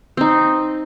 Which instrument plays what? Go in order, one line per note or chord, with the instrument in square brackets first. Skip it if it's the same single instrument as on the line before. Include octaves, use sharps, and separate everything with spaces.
[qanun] C4 D#4